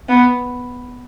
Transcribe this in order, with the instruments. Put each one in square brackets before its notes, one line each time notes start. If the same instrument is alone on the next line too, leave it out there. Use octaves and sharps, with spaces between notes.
[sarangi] B3